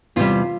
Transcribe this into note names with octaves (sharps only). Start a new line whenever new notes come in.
E2 C3 G3 F4